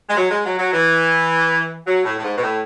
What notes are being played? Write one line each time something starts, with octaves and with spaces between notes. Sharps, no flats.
G#3
F#3
G#3
F#3
F#3
E3
F#3
A2
A2
G#2
B2
A2